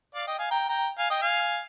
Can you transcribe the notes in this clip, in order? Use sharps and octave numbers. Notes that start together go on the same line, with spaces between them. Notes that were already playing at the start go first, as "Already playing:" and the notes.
D5 F5
D#5 G5
F5 G#5
G5 A#5
G5 A#5
F5 G#5
D#5 G5
F5 G#5